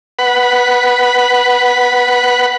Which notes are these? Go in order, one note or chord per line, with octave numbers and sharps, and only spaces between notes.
B4 F#5 B5